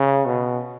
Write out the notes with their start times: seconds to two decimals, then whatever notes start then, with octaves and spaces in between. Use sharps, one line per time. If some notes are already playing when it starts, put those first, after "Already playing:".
Already playing: C#3
0.26 B2